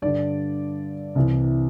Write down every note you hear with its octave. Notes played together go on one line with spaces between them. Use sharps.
G2 D3 D5
C2 C3 E3